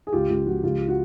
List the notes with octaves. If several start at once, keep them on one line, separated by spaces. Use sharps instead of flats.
G#4
C#2 F4 G4
C#2 F4
F3 F#4
C#2 F4 G4
F#4